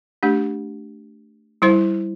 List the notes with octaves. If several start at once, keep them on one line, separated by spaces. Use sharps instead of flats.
A3 D4 G4
G3 E4 C5